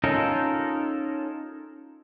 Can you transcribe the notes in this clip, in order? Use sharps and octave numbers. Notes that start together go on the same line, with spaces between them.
C#4 D#4 F4 A4 A#4